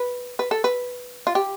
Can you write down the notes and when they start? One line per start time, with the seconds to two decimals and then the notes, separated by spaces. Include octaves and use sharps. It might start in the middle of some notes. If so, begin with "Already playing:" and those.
Already playing: B4
0.39 B4
0.51 A4
0.64 B4
1.27 F4
1.35 G4